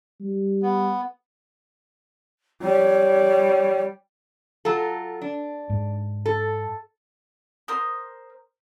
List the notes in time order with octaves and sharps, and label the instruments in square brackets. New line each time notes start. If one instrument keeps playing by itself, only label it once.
[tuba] G3
[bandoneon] B3
[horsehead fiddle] G3 [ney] C#5
[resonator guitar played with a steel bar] F#3 F4 A4
D4
[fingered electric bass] G#2
[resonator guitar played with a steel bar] A4
[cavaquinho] A#4 C5 C6 D#6